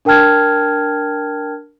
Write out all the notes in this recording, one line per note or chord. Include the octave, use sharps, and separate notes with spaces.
D4 A#4 G5 A5 F6 G#6